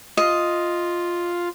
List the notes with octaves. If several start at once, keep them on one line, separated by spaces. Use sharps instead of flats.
F4 D#5